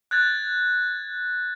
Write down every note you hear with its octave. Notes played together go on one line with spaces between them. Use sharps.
F#6 G#6 A6